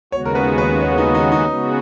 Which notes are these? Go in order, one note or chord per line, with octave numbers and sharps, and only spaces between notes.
D#2 C#3 G#3 B3 F#4 C#5
A#4
B4
B4
C#4
D#4
D#4
D#4
C#3 G#3 B3 F#4